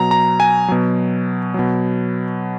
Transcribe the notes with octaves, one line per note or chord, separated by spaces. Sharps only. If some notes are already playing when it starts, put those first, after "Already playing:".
Already playing: B2 F#3 A#5
A#5
G#5
B2 F#3
B2 F#3